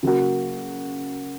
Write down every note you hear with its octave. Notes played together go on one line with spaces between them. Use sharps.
C#3 F#3 A#3 F#4